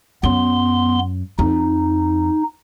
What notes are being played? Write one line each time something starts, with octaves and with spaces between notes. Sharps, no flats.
F#2 B3 C6
F2 D#4